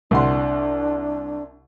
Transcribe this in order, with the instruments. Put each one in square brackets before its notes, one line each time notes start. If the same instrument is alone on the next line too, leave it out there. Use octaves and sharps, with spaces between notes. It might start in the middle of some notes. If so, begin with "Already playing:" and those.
[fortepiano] C2 F#5 C6 [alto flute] D4